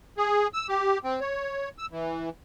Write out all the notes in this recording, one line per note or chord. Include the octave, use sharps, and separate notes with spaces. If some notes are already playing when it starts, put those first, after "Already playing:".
G#4
E6
G4
C4
C#5
E6
E3